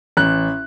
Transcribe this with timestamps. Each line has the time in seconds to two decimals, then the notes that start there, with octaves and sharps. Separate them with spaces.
0.17 A1 F#6